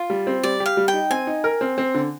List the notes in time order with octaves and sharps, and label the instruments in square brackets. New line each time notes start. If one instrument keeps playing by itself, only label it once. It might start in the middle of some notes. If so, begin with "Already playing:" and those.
Already playing: [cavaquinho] F4
[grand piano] G3
C4
[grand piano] G3 [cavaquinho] D5
[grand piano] G4
[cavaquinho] F5
[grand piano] G3
[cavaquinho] G5
[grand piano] D#4
[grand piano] C4 [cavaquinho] G#5
[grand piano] D#4
A#4
C4
C4
D3